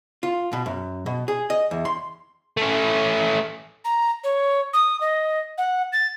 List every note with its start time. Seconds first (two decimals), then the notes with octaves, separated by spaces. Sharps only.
0.23 F4
0.53 B2
0.66 F#2
1.06 B2
1.28 G#4
1.50 D#5
1.71 E2
1.85 C6
2.57 A3 C#4
3.85 A#5
4.24 C#5
4.73 D#6
5.01 D#5
5.58 F#5
5.93 A6